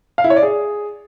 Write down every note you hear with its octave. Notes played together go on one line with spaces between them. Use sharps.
F5
E4
C#5
D5
G#4